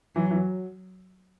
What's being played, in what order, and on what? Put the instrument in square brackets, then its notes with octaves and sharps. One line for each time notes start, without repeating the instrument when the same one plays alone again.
[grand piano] E3 [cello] F#3
[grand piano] E3
F#3